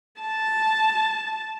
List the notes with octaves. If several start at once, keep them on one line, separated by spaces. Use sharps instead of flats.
A5